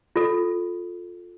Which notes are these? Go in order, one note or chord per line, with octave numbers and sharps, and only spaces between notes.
F4 A4